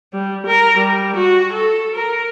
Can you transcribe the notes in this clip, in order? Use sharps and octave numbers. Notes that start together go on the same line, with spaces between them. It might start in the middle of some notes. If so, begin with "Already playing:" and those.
G3
A#4
G3
F#4
A4
A#4